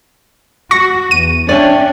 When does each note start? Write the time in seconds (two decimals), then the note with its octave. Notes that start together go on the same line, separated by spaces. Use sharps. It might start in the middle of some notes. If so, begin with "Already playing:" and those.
0.71 F#4 C#6 A#6
1.11 E2 D#7
1.49 C#4 D4 C#5 D5 E5 G5